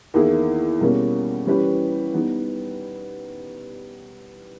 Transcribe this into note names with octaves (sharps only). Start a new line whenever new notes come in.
E2 D#3 A#3 E4 G#4
B2 G3 A#3 C#4
E3 G3 C#4 G4 B4
G3 B3 D#4